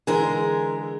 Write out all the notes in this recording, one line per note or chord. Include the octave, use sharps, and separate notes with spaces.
D3 E3 G#3 G#4 A#4